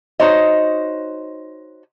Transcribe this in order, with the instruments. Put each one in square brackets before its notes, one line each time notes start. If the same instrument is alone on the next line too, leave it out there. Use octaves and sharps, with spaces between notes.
[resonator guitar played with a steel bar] D#4 F#4 C5 C#5 D#5